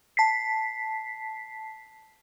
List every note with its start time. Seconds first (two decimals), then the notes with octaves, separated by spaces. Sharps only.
0.17 A5 B6 C7